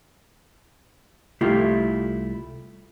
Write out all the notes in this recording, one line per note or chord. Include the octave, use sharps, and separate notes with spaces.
C2 A3 E4 F4 G4